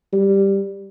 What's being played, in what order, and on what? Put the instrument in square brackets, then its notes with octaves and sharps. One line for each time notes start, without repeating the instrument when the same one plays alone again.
[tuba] G3